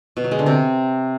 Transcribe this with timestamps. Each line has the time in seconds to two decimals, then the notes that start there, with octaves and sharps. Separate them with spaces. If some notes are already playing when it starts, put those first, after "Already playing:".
0.17 B2
0.24 F#3
0.31 G#3
0.39 D3
0.46 C3